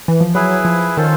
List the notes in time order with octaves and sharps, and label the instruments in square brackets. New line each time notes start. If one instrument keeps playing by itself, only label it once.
[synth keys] E3
F3
[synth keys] F#3 [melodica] E4 G#4 B4
[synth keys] F3
[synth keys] D#3 [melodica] C#4 F4 A4 C5